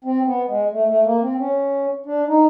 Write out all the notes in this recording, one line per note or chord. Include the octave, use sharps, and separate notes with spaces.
C4
B3
G#3
A3
A3
A#3
C4
C#4
D4
D#4